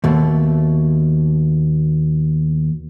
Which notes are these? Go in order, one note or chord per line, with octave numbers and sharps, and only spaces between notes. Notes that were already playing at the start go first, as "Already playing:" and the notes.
D#2 B2 A3